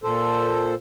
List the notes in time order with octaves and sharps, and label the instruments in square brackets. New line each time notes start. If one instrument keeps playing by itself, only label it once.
[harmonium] A#2 A4 C5